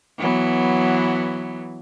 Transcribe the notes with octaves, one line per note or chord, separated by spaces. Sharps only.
E3 F#3 B3